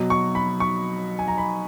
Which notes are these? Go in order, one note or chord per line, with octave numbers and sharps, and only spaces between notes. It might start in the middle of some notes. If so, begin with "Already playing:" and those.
Already playing: B2 F#3
C#6
B5
C#6
G#5
A#5
B5